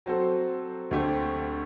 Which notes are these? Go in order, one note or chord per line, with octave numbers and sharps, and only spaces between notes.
F#3 C4 F#4 A4 C5
D2 D3 A3 C4 G4